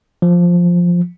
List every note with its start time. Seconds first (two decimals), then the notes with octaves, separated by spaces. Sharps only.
0.22 F3